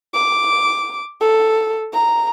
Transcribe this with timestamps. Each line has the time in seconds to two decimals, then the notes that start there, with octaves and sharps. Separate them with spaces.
0.14 D6
1.21 A4
1.93 A#5